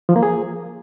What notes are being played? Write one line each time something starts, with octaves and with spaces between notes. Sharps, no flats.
F3
A#3
G#4